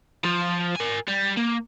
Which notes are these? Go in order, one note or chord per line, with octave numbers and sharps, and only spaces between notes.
F3 F4
A#4 G#5
G3
A#3